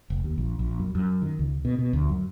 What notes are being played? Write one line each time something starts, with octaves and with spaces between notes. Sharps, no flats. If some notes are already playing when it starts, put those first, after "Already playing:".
F1
D#2
A#1
A#1
F#2
F#2
D#3
C#2
B2
B2
D2
F#2